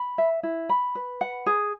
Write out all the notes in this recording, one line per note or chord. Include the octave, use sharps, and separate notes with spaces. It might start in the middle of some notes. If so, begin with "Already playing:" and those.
Already playing: B5
E5
E4
B5
B4
F#5
G#4